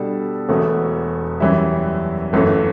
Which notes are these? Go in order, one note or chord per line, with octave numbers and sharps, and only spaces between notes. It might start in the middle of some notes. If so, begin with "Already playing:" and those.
Already playing: B2 G3 D4 A4
E1 E2 B2 A3
F#2 E3 G3 C#4 E4
G1 F#2 E3 A3